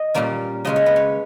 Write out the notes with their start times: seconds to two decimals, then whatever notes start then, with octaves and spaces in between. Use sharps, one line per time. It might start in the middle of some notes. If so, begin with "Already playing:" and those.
Already playing: D#5
0.14 A#2 G3 A#3 C#4
0.65 C#3 G#3 C#4 D#5
0.76 C#5
0.86 B4
0.96 C#5